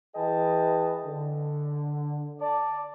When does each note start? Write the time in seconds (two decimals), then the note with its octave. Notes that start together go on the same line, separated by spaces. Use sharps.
0.16 E3 G#4 B4 D#5 G5 A5
1.06 D3
2.40 D5 A5